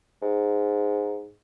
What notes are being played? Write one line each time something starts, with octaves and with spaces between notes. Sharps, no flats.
G#2